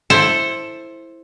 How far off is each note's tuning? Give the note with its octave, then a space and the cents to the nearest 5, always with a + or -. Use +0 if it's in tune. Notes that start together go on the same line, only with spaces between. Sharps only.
E4 +0 A4 +0 C5 +10